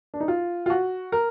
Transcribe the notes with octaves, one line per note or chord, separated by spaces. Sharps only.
D4
D#4
F4
F4
F#4
A#4